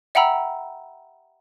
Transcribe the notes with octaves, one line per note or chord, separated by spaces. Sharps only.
E5 F#5 G5 A#5 B5 E6